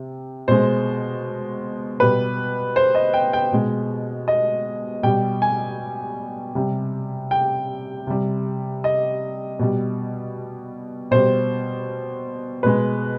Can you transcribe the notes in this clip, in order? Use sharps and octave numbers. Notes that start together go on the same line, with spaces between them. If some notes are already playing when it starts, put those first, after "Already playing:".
Already playing: C3
B2 G#3 C5
B2 G3 B4
C5
D#5
G5
G5
B2 G#3
D#5
B2 G3 G5
G#5
C3 G3
G5
C3 G3
D#5
B2 G3
B2 G3 C5
B2 G#3 B4